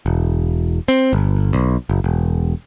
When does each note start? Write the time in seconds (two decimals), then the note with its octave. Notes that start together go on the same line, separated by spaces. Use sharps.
0.06 E1
0.88 C4
1.13 G1
1.53 B1
1.89 F#1
2.04 E1